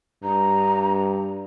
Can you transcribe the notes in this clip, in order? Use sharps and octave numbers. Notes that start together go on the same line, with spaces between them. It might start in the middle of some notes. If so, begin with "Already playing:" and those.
G2 A#5